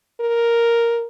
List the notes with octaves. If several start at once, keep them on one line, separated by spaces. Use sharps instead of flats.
A#4